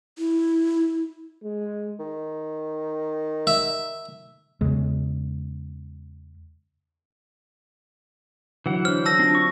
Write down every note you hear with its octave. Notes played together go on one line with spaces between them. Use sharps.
E4
G#3
D#3
E5
E2 C#3 G#3
D3 E3 F#3 F#5
D4 C5 F6
A5 E6 A#6
C4 D4 F4
C#6